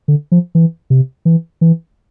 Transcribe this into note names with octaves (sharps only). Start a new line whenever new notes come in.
D3
F3
E3
C3
E3
E3